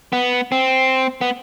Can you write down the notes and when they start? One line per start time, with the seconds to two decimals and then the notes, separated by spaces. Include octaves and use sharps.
0.13 B3
0.52 C4
1.21 B3